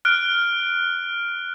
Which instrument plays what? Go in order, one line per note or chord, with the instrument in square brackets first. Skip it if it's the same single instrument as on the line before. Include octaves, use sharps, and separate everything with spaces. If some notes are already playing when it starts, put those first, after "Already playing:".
[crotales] F6 F#6 D7